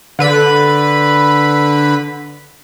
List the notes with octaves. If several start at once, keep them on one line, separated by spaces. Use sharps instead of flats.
D3 B4 B5